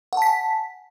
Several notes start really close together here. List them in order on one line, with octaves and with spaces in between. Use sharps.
F#5 A5 B6 G#5